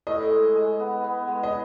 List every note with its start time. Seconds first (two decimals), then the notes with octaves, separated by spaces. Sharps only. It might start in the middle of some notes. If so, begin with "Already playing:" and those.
0.07 A2 D#5
0.31 G#3
0.56 G#3
0.80 B3
1.04 B3
1.28 G#3
1.43 D#5